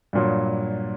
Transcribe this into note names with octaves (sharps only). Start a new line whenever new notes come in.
G2 A#2 F#3